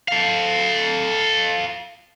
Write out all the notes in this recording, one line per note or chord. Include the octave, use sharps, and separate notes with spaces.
A4 F5